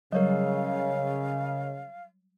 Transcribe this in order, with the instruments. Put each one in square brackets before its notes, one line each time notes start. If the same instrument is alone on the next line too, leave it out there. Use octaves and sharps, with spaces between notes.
[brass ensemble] C#3 [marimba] F#3 G3 [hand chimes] A#4 C#5 D#5 [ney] F5